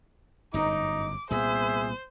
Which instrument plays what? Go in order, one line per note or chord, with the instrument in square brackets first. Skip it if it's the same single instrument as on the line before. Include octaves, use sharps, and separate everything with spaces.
[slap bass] G1 F#2 A2 [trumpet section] D#4 [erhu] D6
[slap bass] C2 A#2 B3 [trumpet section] G#4 E5 [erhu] C5